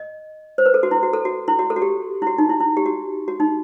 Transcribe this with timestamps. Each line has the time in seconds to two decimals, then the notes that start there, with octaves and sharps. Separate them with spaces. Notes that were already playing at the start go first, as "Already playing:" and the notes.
Already playing: D#5
0.58 C5
0.66 B4
0.74 A4
0.83 F#4
0.91 E4
1.03 F#4
1.13 A4
1.25 F#4
1.48 E4
1.59 F#4
1.70 A4
1.76 F#4
1.82 G4
2.22 E4
2.27 F#4
2.38 D#4
2.49 E4
2.60 E4
2.77 G4
2.86 F#4
3.28 F#4
3.40 D#4